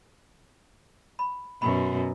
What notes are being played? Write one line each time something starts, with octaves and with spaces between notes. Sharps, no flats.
B5
F#2 B2 G4 B5